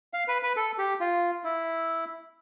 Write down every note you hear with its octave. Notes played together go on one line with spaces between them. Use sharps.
F5
B4
B4
A4
G4
F4
E4